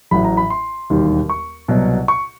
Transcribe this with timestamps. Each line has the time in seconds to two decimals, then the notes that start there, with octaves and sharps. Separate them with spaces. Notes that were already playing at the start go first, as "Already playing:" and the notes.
0.11 A1 A2 F#3 B5
0.24 A#5
0.37 B5
0.50 C6
0.90 E1 D#2 D#3 G3
1.30 C#6
1.68 C2 B2 F#3
2.08 C#6